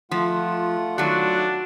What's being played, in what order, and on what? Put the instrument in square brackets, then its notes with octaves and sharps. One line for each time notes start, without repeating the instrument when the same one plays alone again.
[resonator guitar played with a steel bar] F3 [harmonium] A3 F4 F#5
[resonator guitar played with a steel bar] D#3 F#3 [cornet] D4 [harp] F#4